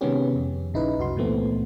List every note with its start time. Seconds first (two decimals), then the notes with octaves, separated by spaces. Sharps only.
0.01 C3 D#3 G#3 B3 C#4 G4
0.35 F2
0.73 A#1 C#3 D#4 E4 B4
0.98 C2 F#2 F#4 C6
1.16 C#2 A#2 E3 A3 B3 C4